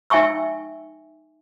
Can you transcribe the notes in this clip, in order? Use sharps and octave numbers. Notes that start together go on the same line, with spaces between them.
D#4 E5 G5 G#5 C#6 E6